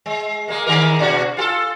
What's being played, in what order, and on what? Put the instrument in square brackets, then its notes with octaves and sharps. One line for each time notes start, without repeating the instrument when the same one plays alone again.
[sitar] G#3
G#3 A#3
D#3 G#3 A#4
B2 D4 F#4
F4 G4 A4